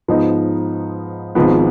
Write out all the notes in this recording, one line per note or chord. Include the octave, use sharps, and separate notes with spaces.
G#2 F3 B3 D#4
G#1 G#2 F3 B3